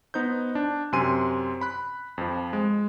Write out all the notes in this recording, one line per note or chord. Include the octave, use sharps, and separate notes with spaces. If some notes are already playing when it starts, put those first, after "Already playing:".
B3 D#4 C5 G6
D4
F#2 C3 G#5 C6 D#7
B5 F#6
F2 F3
G#3